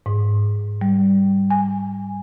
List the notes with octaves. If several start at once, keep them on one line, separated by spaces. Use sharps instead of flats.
G#2
G3
G#5